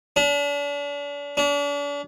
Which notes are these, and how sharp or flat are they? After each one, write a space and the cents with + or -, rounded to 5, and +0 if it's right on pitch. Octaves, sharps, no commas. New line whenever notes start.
D4 -40
D4 -40